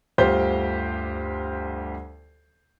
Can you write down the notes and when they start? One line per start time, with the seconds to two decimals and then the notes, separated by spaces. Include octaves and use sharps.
0.18 D2 G2 F4 G4 C5 G6